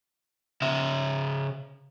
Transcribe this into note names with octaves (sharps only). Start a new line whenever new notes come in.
C#3 E5